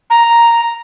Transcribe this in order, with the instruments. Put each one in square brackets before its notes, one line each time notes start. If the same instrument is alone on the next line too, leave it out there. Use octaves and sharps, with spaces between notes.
[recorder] A#5